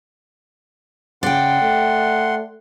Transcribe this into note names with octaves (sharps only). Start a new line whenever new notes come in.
C#3 D5 F#5 G5 C6
A3